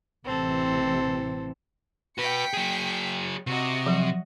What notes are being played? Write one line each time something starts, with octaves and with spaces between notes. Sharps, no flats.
A1 C3 E3 C4 A4
F#4 B4 G5 B6 C#7
F#3 G#4
C3 F#4 D#5
F3 F#3